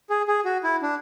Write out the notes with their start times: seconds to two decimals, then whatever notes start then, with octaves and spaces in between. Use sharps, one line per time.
0.10 G#4
0.28 G#4
0.45 F#4
0.63 E4
0.82 D4